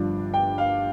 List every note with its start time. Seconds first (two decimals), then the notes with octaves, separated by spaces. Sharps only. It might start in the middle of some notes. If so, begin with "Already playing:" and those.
Already playing: G1 G2 F3 D4
0.34 G5
0.58 F5